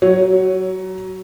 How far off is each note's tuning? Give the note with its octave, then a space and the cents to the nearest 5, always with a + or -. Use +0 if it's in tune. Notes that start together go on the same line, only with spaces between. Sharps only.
F#3 +20 C#5 +0